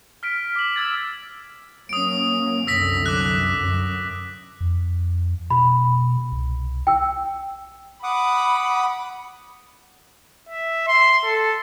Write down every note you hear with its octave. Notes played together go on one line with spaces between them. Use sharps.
F6 B6 D7
D6 F#7
E6 G#6 A6
F#3 A#3 C#4 D#6 D7
C2 F#2 D3 E6 A#6 B6
D6 F#6
F#2
F2
B2 B5
C2
G5 E6
F#5 B5 D6 D#6
E5
C6
A4